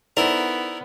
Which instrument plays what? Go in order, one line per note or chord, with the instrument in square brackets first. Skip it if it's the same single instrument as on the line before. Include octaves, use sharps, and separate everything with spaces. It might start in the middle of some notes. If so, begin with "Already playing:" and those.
[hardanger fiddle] B3 [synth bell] D#4 C5 D5 [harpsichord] E4 A#4